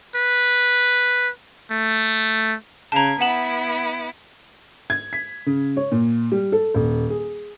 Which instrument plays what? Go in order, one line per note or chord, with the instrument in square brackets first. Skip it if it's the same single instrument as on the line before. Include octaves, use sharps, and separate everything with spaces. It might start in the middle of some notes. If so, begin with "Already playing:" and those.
[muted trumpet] B4
A3
[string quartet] C#3 G#6 [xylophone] A5 A#5
[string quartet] B3 E4 [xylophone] F#5 E7 F#7
[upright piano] G#6
B6
C#3
C#5
A#2
G3
A4
D#1
G#4